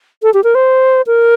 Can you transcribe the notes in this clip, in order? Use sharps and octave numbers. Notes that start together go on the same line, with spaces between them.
A4
G4
A#4
C5
A#4